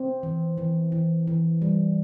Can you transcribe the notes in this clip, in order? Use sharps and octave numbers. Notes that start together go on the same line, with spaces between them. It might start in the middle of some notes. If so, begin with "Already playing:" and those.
Already playing: C4
E3
E3
E3
E3
G3